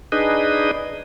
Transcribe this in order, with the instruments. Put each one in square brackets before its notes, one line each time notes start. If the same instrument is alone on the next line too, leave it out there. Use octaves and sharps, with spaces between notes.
[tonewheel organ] D4 D#4 G#4 B4 D#5